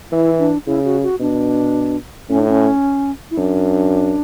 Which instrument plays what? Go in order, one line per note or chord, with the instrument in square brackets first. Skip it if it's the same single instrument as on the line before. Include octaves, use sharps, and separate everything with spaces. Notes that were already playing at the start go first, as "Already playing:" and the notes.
[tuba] E3 [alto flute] E4
[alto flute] D4
[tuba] C#3 [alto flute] E4
[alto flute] F#4
F#4
[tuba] B2 [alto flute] D4
[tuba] A2 [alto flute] C#4
[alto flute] D4
C#4
E4
[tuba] F#2 [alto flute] D4